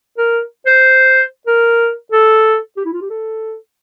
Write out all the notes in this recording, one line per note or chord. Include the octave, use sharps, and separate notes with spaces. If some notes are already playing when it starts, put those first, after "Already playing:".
A#4
C5
A#4
A4
G4
E4
F4
G4
A4